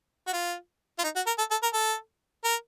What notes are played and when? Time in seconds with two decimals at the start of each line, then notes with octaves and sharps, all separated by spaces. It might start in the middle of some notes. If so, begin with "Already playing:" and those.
0.27 F#4
0.33 F4
0.99 F4
1.04 D#4
1.16 F#4
1.26 A#4
1.38 A4
1.51 A4
1.63 A#4
1.73 A4
2.44 A#4